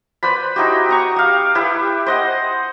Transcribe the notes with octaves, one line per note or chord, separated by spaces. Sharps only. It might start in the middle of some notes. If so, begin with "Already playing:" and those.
B4 C5 D5 B5
D#4 E4 F#4 G4
D#5 A#5 C#6
G4 F5
E4 G4 B4
C5 D#5 F#5